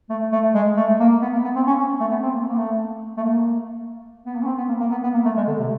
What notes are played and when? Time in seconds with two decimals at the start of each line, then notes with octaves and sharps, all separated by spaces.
0.10 A3
0.32 A3
0.55 G#3
0.77 A3
1.00 A#3
1.22 B3
1.33 A#3
1.44 B3
1.56 C4
1.67 C#4
1.78 C#4
2.00 A3
2.11 B3
2.23 C4
2.34 A#3
2.48 A#3
2.57 A3
3.17 A3
3.23 A#3
4.26 B3
4.36 A#3
4.43 C#4
4.47 C4
4.58 B3
4.69 A#3
4.81 A#3
4.91 B3
5.04 B3
5.14 A#3
5.25 A3
5.37 G#3
5.47 D3
5.59 C3